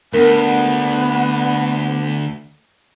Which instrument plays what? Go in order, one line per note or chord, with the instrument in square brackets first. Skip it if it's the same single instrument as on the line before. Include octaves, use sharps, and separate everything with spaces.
[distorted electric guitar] D2 [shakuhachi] B3 [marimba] A#4